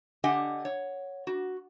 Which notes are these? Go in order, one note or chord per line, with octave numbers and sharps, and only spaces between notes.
D3 G4 D#5 F#5 G#5
C#5
F#4